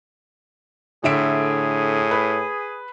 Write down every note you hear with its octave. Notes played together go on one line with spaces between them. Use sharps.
A2 D3 G#4 E5 D7
B4